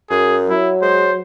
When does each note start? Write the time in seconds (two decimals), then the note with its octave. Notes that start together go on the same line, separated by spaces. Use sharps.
0.10 F#2 G#4
0.49 F#3 E4
0.82 G#3 C5